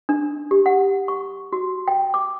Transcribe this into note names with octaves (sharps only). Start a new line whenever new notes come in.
D4
G4
F#5
C#6
F#4
G5
D6